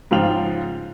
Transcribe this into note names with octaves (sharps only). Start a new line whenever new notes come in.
G#2 C#3 F3 F4 G5 F7